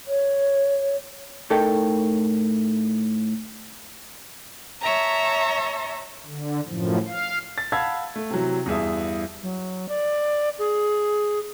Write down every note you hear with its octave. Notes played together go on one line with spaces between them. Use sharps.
C#5
A2 D#4 A4 A#4 G5
C#5 E5 A5 A#5
D3
F#2 A2 F3
F5
A6
F5 F#5 A5 B5 E6 G#6
A3
C3 E3 F#3
E2 G2 G#4 E5
F#3
D5
G#4